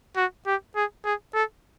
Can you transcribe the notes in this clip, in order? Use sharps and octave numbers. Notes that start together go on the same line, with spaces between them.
F#4
G4
G#4
G#4
A4